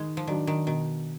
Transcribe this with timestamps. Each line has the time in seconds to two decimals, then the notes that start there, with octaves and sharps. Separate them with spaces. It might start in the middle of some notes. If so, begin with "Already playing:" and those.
Already playing: D#3 G#3
0.17 F3
0.27 D#3 F#3 D4
0.47 D#3
0.66 B2 D#3